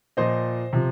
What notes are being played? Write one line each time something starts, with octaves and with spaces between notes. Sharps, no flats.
A#2 F3 C5 D#5
C3 F3